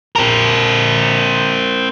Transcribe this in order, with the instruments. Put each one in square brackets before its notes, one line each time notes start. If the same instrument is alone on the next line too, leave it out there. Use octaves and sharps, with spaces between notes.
[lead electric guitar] C4 A#4